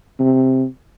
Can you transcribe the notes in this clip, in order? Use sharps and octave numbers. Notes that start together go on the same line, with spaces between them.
C3